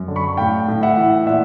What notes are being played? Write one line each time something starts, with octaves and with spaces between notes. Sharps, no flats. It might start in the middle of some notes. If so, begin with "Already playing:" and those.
Already playing: F#2
D3
B5 C#6
A2 F5 G5
A2
E5 F#5
E3
A#2 E5 F#5